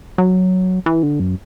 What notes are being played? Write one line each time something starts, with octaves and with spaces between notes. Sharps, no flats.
F#3
E3
D3
F#2